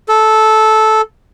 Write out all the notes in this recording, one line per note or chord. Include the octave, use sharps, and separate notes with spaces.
A4